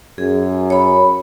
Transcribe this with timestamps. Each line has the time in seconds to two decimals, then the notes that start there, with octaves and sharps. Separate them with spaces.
0.18 F#2 G#4
0.70 C#5 B5